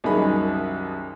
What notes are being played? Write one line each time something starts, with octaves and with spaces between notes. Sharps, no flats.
C2 F#2 D#3 G#4 D#5 B5